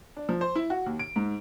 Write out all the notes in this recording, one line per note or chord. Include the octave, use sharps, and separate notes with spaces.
D4
F3
C5
E4
F#4
D#2
D7
G#2